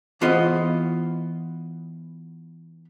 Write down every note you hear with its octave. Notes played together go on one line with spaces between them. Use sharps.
E3 B3 F4 G#4 C5 D#5